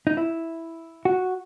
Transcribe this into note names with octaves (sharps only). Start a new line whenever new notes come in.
D#4
E4
F#4